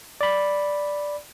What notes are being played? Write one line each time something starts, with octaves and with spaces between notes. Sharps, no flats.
D5 B5